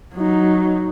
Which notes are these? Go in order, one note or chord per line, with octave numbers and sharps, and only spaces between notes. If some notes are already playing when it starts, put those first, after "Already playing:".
F#3 D#4